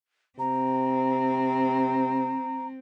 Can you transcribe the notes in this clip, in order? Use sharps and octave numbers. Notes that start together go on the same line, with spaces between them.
C3 C4 A#5